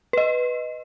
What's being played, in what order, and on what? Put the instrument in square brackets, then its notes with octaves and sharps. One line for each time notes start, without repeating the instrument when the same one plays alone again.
[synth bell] B4 D#5